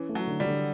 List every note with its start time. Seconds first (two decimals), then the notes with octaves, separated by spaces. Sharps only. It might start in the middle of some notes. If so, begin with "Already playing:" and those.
Already playing: E3 C#4
0.09 A3
0.15 F#3
0.27 D3
0.40 G3
0.46 D3